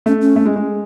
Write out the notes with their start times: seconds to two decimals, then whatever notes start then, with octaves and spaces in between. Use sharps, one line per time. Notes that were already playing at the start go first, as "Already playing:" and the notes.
0.06 A3 C#4
0.22 C#4
0.36 A3
0.46 G#3
0.56 G#3